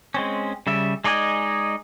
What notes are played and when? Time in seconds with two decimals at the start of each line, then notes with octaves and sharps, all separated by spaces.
0.14 G#3 C4 C#4
0.67 C#3 G3 E5
1.04 G#3 D#4 D5 D#5 G#5